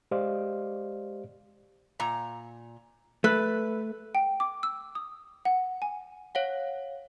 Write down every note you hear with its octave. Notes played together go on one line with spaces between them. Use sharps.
G#3 G4 C5 D5 D#5 F5
A#2 A#5
A3 B4
G5
D6
E6
D#6
F#5
G#5
C#5 F5 F#5